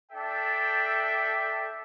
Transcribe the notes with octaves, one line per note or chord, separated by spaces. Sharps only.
D4 A4 E5 G5